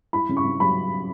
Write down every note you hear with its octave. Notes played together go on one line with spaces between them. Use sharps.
E4 B5
C#3
C#6
C#3
F#3 B5